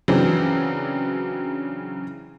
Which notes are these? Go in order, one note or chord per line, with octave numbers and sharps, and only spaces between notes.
C#3 E3 F#3 C4 D4